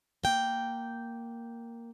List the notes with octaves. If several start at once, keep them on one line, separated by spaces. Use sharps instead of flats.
A#3 G5